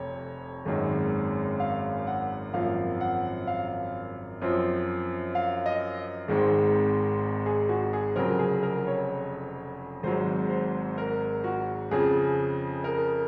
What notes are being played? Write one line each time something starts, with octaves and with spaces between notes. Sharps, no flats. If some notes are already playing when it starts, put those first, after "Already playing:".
Already playing: F1 F2 C3 C#5
G#1 F#2 D#3 G#3
F5
F#5
G#1 F#2 F3 A#3 F5
F#5
F5
F#2 F3 C4
F5
D#5
G#1 G#2 D#3 G#3 C4
G#4
F#4
G#4
F1 F2 C#3 F#3 C4 A#4
G#4
A#4
C#5
G#1 G#2 F#3 C5
C5
A#4
F#4
F2 C#3 F3 G#4
A#4